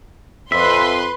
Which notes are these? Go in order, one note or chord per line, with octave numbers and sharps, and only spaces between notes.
F2 B4 E5 C6